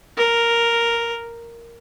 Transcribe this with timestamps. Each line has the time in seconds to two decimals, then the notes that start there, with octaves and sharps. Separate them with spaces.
0.18 A#4